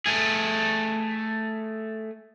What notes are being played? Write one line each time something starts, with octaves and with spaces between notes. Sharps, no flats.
A3 G#4